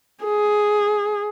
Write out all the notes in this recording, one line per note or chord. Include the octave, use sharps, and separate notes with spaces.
G#4